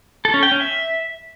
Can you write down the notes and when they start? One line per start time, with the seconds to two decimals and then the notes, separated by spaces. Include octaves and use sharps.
0.25 A4
0.34 C#4
0.43 G5
0.52 C#4
0.60 E5